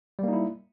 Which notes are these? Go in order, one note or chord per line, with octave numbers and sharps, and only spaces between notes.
G3 A#3 D#4 E4